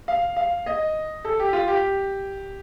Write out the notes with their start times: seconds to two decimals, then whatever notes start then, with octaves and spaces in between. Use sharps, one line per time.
0.08 F5
0.36 F5
0.66 D#5
1.25 A4
1.39 G4
1.53 F4
1.68 G4